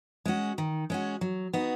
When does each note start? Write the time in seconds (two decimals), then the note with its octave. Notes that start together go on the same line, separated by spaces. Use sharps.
0.25 G#3 C#4 F#4
0.58 D#3
0.90 G#3 C#4 F#4
1.21 F#3
1.53 B3 D#4 F#4